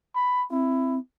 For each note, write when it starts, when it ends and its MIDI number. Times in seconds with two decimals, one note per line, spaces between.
0.15 0.45 83
0.51 0.98 60
0.51 0.97 64